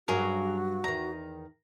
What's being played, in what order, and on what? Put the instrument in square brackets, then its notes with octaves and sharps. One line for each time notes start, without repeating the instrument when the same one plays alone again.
[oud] G2 F#3 C#4 [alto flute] F#4 [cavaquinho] G#4 A#4
[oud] E2 D#3 [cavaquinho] A#5